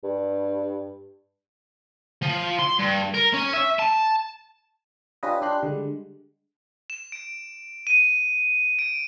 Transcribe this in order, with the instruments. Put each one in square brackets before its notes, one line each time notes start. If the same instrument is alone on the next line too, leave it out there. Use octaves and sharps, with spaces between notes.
[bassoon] G2
[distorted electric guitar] F3
C6
G2
A#4
C#4
E5
A5
[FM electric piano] C#4 D4 F4 G4 B4 D#5
D4 G4 C6 F#6
D3 G3 G#3
[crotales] E7
D7
D#7
D7